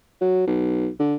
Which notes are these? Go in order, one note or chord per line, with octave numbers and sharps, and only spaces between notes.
F#3
B1
D3